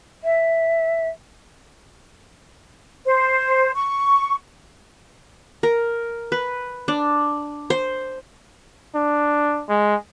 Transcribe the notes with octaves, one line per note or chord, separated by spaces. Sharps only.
E5
C5
C#6
A#4
B4
D4
C5
D4
G#3